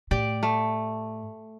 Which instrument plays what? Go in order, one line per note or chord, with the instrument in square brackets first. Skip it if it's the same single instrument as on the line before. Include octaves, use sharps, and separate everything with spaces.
[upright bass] A2 [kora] G4 D5
[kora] A3